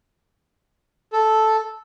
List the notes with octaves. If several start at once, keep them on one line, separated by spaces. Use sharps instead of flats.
A4